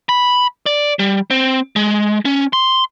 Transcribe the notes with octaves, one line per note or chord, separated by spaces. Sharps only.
B5
D5
G3
C4
G#3
C#4
C6